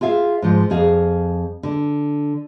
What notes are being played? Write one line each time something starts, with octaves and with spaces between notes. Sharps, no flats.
F4 G#4 E5 F5
G#2 F3
F2 G#4 F5
D3